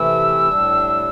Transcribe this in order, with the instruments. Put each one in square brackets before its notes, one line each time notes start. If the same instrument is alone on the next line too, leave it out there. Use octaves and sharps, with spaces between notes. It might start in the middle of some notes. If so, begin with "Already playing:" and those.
Already playing: [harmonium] C3 E3 A3 E4 [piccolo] E6
[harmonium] A2 G3 D4